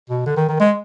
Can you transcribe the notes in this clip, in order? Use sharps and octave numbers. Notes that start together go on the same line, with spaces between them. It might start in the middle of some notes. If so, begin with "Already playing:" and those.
B2
D3
D#3
D#3
G#3